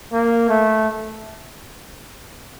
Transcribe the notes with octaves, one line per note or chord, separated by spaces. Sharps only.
A#3
A3